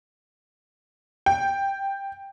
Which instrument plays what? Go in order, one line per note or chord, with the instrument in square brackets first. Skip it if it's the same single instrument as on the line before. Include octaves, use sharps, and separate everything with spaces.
[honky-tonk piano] G5